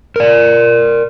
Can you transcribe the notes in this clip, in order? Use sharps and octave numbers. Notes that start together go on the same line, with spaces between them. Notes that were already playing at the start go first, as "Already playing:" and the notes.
A#4 D5